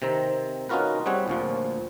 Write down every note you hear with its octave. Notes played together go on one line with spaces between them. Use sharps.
C3 D#3 C4 A#5
C#4 D#4 F4 F#4 A#4 B4
G3 C4 G#4 C#5 F#5
D2 A#2 F3